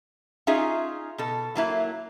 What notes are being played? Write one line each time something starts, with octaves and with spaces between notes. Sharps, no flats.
C#4 D#4 F4 G#4 E5
B2 A4
F#3 A#3 E4